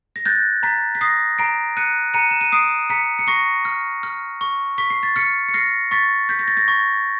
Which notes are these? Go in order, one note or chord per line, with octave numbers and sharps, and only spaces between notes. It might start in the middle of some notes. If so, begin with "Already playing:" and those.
A#6
F#6 G6 A6
A#5 A6 B6
B6
D#6 A#6 C7
A#5 C7 D7
F#6 C#7 D#7
A#5 C#7 D#7
E7
D#7
D#6 C7 D7
A#5 B6 C#7
C#7
C#6 A#6 C7
F6
F6
C#6
C#6 B6
C7
A6 B6
F6 B6 C#7
C#7
F6 A#6 C7
C#6 A6 B6
G6 B6
A#6
A6
G#6 A#6
C#6